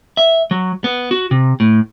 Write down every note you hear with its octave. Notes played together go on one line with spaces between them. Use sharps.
E5
F#3
B3
F#4
C3
A2